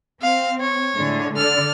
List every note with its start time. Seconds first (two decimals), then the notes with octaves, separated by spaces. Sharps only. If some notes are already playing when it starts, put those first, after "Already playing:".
0.22 C4 F5
0.60 C#5
0.96 A2 D3 G#3
1.36 D3 A4 D5 F6